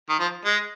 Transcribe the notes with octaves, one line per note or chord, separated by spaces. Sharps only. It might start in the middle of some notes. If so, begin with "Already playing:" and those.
D#3
F3
G#3